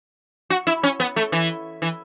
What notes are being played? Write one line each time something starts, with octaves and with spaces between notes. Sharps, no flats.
F#4
E4
C#4
B3
A3
E3
E3